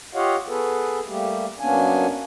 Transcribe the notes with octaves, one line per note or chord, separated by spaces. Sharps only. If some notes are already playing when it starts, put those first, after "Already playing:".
F4 G4 C#5 D#5 F5 F#5
B3 G#4 A4 B4
G3 A3 A#3 G4
F#2 A#3 B3 C#4 D4 G#5